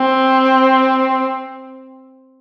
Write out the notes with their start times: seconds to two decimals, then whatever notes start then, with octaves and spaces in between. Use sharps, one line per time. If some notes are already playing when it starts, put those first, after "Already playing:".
Already playing: C4